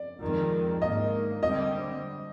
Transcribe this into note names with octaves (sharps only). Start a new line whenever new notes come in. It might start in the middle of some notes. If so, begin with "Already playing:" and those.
Already playing: D5
F2 D#3 G#3
G#2 D#3 A#3 D#5
D3 G3 C4 D#5